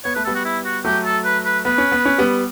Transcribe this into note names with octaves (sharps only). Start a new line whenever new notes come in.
B3 C#5
A3 B4
G3 B3 A4
F#4
E4
F#4
F#3 A3 G4
A4
B4
B4
B3 B4
C#4
B3
C#4
G3 B3